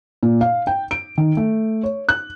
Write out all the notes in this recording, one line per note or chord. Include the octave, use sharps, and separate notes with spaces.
A#2
F5
G5
D7
D#3
A3
C#5
F#6